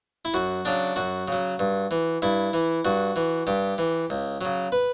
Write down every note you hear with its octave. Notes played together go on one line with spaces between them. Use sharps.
E4
F#2 F#4
C#3 F#3 D4
F#2 F#4
C#3 F#3
G2
E3
G2 E4
E3
G2 F#4
E3
G2 G4
E3
C#2
C#3 F#3
B4